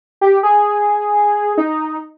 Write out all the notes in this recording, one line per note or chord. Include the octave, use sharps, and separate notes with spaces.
G4
G#4
D#4